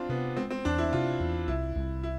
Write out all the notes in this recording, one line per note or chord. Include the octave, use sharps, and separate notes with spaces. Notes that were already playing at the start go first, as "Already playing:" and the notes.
Already playing: C4 D4 F4
C3 B3
G#3 C4
C4
E2 D4
E4
C3 F4
E2
C2 E4
C2
E4